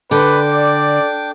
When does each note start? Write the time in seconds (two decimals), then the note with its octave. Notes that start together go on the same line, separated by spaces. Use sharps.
0.11 D3 D4 B4 G5 D6
0.52 D5